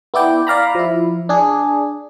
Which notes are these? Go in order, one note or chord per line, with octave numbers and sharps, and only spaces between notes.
B3 E4 D5 G5
D5 F5 A#5 B5
F3 E4
D4 G#4